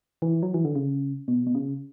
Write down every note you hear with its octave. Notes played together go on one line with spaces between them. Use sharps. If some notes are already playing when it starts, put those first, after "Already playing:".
E3
F#3
E3
D3
C#3
B2
B2
C#3